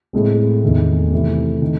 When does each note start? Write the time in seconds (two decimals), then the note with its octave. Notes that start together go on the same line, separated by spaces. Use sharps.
0.13 A2 G#3 C4
0.63 E2 D#3 A3 C4
1.11 C3 E3 A3 C4
1.62 D#3